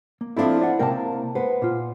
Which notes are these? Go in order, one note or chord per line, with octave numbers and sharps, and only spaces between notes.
A#3
F3 C4 D4 E4 A4 F5
D5 F#5
C3 A#3 A#4 G5 A5
B3 B4 C5
A#2 F4